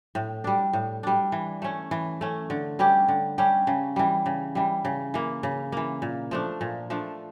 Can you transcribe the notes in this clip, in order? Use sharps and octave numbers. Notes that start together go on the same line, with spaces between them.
A2
G3 D4
A2
G3 D4
E3
A3 C#4
E3
A3 C#4
D3
G3 C#4 G4
D3
G3 C#4 G4
C#3
E3 G3
C#3
E3 G3
C#3
E3 A#3
C#3
E3 A#3
A#2
F3 A3 D4
A#2
F3 A3 D4